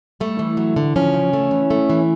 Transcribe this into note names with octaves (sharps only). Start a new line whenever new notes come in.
G3 A3
E3
F#3
D3
F3 C#4
C#3
A3
E3
A3
E3